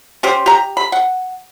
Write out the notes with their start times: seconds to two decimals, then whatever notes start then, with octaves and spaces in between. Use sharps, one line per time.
0.23 C#4 G4 C5
0.46 G4 A#5
0.77 B5
0.92 F#5